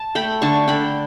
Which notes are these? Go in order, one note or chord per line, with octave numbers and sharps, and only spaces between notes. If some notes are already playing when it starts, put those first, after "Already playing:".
Already playing: A5
A3 G5 B5
D3 A5 C#6
D3 G5 B5